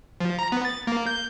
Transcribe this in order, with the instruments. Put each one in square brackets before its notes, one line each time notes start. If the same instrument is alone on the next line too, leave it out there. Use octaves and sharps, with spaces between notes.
[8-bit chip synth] F3
A#5
B3
A6
A#3
G6